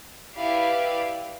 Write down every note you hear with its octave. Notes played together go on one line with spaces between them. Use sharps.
E4 G4 B4 D5 F5